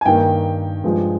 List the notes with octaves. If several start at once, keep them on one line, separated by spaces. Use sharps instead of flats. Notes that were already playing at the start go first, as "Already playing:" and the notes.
G#5
G2 D#3 A#3 G5
G2 F3 G#3